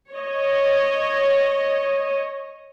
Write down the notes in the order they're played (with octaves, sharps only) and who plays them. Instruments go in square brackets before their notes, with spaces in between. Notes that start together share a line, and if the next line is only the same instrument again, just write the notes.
[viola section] C#5 D#5